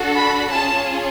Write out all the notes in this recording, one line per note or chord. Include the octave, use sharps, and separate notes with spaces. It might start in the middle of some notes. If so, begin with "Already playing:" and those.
Already playing: D4 F#4 A4
B5
C#4 F4 G#4 A5